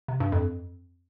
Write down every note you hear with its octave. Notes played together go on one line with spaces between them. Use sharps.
C3
G2
F2